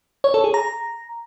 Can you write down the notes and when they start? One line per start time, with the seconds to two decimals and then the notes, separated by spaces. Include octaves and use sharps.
0.24 C#5
0.34 A4
0.44 G#4
0.54 A#5